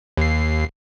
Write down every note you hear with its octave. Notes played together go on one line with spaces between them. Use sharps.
D#2 C7